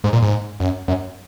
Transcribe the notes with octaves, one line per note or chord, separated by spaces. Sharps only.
G#2
A#2
G#2
F#2
F#2